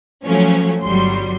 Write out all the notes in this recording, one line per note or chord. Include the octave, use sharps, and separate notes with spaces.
F3 F#3 A3 C#4
G1 F#3 G3 C6